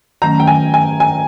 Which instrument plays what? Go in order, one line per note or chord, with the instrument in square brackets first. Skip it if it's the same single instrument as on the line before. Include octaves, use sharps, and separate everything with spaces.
[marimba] D#3 F#3 A3 C#4 [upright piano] A#5
[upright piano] G5
G#5
G#5
G#5